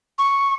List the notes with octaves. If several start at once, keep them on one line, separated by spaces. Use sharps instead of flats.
C#6